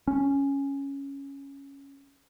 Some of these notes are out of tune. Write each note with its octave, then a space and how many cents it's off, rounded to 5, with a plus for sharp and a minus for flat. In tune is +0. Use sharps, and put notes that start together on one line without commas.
C#4 +0